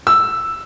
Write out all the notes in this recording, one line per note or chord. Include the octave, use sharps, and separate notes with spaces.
E6